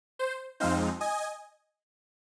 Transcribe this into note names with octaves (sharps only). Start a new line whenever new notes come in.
C5
F2 F3 G#3 C4 D#4 C5 F5
D#5 G#5